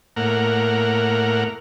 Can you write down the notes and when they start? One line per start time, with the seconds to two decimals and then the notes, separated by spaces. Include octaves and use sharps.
0.16 A2 A#3 A#4 F#5